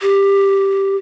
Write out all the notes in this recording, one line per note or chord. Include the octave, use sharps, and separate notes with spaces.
G4